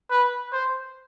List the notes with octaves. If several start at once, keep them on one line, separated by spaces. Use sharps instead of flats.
B4
C5